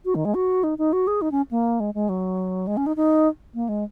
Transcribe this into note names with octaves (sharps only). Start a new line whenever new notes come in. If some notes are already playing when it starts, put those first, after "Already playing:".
F#4
D#3
G#3
F#4
D#4
D#4
F#4
G#4
D#4
C#4
A#3
G#3
G#3
F#3
G#3
C#4
D#4
D#4
A#3
G#3